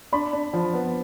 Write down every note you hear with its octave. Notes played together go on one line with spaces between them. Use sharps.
D4 B5
D4
F3
B3